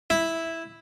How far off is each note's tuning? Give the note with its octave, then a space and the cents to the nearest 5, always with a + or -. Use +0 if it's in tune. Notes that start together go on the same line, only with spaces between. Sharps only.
E4 -5